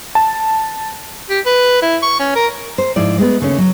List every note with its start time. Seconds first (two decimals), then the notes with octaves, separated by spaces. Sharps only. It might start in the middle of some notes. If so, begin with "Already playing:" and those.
0.15 A5
1.29 G4
1.46 B4
1.82 E4
2.02 C#6
2.20 C#4
2.36 A#4
2.78 C5
2.96 G#2 F3 E4 D5
3.18 G#3 A3 B3
3.40 D#2 C#3 A3 C#4
3.58 F#3